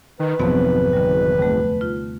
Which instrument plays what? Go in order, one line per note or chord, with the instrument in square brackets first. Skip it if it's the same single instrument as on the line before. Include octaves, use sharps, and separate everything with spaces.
[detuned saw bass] D#3 [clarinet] B4
[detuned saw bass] G#1 [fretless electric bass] F2 F3 F#3 [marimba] C3 B3 C4
[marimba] D3 G3
D#2 A3
F4